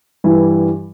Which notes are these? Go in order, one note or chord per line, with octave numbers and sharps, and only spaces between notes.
G2 E3 G3